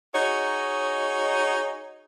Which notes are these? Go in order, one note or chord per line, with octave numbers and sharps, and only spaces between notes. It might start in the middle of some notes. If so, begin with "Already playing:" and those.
D#4 F#4 G#4 C#5 D#5